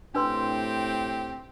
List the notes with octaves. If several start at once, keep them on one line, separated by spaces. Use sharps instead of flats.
A2 C4 D4 G4 B4 C6